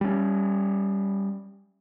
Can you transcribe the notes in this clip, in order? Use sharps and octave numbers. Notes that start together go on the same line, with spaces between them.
G3 C#4